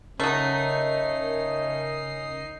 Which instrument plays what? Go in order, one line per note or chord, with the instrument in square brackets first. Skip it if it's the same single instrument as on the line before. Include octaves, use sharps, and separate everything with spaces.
[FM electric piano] C#3 A#4 [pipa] F#3 A3 [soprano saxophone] C#4 [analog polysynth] D#4 C7